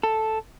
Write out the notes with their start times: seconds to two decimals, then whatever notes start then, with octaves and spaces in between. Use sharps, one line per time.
0.03 A4